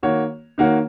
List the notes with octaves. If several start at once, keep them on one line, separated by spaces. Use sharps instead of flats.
D#3 A#3 F#4 C#5
D#3 A#3 F#4 C#5